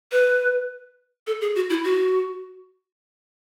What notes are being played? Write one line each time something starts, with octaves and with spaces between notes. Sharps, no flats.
B4
A4
G#4
F#4
E4
F#4